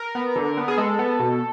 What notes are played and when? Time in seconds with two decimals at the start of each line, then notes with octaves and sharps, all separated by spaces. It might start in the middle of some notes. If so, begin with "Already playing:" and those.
Already playing: A#4
0.15 B3
0.36 D3
0.57 B3
0.68 G#4
0.77 G#3 A4
0.99 B3
1.19 B2